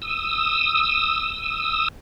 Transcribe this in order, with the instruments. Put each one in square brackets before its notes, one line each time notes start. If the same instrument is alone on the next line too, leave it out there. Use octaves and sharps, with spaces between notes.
[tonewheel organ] D#6 E6